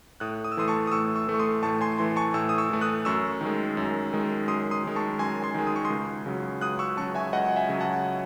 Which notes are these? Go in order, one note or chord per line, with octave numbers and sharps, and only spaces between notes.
A2 D#6 F#6
D#6
E6
E3 A3 C6 D#6
A5 C#6
D#6
A2 C#6 E6
C#6 E6
E3 A3
C#6
C6 D#6
A2 A5 C#6
G#5 C6
E3 A3 G#5 C6
A5 C#6
A2 C#6 E6
D#6
C#6 E6
E3 A3
D#6 F#6
F#2 C#6 E6
D#3 G#3
F#2
D#3 G#3
F#2 C6 D#6
C6 D#6
D#3 G#3
A5 C#6
F#2 G#5 C6
G#5 C6
D#3 G#3
D#6
C#6
C6 D#6
C#2
C#3 F#3
C#2 D#6 F#6
C#6 E6
C#3 F#3 A5 C#6
E5 G#5
C#2 D#5 F#5
E5 G#5
C#3 F#3
F#5 A5